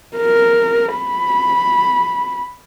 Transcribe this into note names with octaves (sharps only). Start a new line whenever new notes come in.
A#4
B5